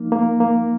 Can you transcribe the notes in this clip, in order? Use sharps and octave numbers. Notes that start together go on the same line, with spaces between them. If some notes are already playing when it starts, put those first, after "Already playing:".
Already playing: F3 A#3 D#4
A#3
A#3